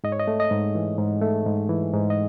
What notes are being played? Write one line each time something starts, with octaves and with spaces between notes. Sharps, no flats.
G#2 D#5
C#5
D#5
A3
D#5
G#2
E3
G#2
A3
G#2
E3
G#2
D#5